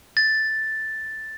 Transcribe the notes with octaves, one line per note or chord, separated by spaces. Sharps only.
A6